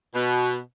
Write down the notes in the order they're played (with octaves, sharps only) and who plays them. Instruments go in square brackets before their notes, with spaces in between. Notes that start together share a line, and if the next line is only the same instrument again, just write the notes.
[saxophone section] B2